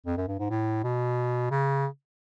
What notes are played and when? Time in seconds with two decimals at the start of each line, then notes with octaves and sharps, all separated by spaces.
0.06 F2
0.17 F#2
0.28 G2
0.40 G#2
0.50 A2
0.84 B2
1.51 C#3